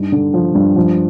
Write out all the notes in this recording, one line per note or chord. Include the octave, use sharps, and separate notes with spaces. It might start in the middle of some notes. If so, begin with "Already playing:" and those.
Already playing: G2 D#4
D3
F3
G2
F3